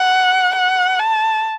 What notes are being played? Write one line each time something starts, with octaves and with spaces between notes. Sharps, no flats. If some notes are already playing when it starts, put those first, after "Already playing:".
Already playing: F#5
F#5
A5